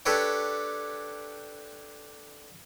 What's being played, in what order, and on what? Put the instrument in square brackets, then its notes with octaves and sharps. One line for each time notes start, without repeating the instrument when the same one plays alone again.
[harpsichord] D4 G4 A4 B4 C#5 G5